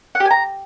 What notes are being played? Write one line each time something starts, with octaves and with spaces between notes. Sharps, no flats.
F#5
G4
G#5
A#5